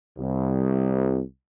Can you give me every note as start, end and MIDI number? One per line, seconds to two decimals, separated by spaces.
0.18 1.21 36